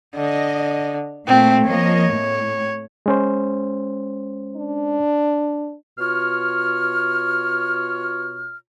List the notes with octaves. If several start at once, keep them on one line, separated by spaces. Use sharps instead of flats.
D3 D#5
A#2 A3 C4
F3 A#3 C#5 D#5
A2
G#3 C#4 C5
D4
B2 F4 C#5 F6